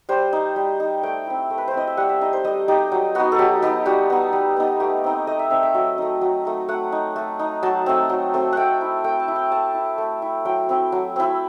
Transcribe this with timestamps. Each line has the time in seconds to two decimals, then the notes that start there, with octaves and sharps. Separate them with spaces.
0.09 G3 C5
0.33 D#4
0.56 G3
0.80 D#4
1.03 A3 G5
1.27 C4 E4
1.50 A3
1.58 B4
1.68 C5
1.74 C4 E4 D#5
1.87 E5
1.97 G3 F#5
2.09 E5
2.21 D#4 D#5
2.33 C5
2.44 G3 D#5
2.68 D#4 G4
2.92 F#3
3.15 B3 D#4 F#4
3.32 A4
3.39 F#3 G4
3.62 B3 D#4 G4
3.86 G3 F#4
4.10 B3 D#4
4.33 G3
4.57 B3 D#4
4.80 A3 G4
5.04 C4 D#4
5.27 A3 D#5
5.39 E5
5.50 C4 D#4 E5
5.63 E5
5.74 F#3 D#5
5.98 A3 D#4 D#5
6.21 F#3
6.45 A3 D#4
6.69 A3 F#5
6.92 D#4
7.16 A3
7.39 D#4
7.63 F#3 A5
7.86 A3 C4
8.09 F#3
8.34 A3 C4
8.53 A3 F#5 G5
8.81 E4
9.04 A3 G5
9.20 A5
9.28 E4
9.36 G5
9.51 A3 A5
9.75 E4
9.98 A3
10.22 E4
10.45 F#3 G5
10.69 C4 E4
10.92 F#3
11.16 C4 E4